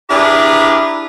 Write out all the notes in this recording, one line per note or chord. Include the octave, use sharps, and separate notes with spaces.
D4 E4 G4 G#4 A#4 B4